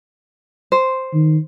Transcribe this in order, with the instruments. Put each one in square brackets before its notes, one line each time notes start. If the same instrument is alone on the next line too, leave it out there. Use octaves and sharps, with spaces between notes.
[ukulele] C5
[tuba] D#3